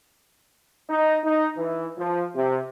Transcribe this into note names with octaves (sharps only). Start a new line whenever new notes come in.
D#4
D#4
E3
F3
C3